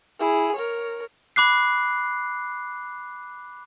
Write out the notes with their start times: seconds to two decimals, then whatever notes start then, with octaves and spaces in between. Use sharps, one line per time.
0.19 E4 G#4
0.56 A#4 C#5
1.36 B5 D6 F#6 C7